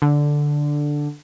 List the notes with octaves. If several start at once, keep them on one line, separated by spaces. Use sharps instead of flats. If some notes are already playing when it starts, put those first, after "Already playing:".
D3